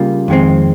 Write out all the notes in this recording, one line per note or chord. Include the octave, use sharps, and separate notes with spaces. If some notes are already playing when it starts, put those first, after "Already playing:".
Already playing: C#3 G3 A#3 F4
F2 D#3 G#3 C4